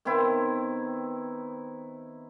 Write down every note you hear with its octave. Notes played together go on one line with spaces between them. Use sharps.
D#3 B3 C4 E4